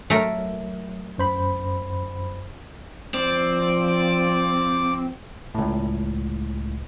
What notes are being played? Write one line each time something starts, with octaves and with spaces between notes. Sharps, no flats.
F#3 A3 A#4
F#2 C5 B5
F3 C4 D5
C#2 A2